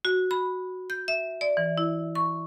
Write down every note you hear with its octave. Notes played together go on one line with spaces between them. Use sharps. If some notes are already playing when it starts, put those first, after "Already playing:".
F#4
B5
G6
E5
D5
E3
E4
C#6